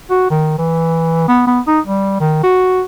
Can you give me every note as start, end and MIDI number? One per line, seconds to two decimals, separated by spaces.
0.10 0.28 66
0.30 0.56 51
0.59 1.24 52
1.28 1.45 59
1.47 1.60 59
1.67 1.80 63
1.87 2.20 55
2.20 2.40 51
2.43 2.83 66